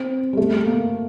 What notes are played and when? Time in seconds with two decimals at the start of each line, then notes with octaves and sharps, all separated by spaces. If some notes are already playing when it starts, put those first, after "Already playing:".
Already playing: C4
0.33 G3
0.37 A3
0.66 A#3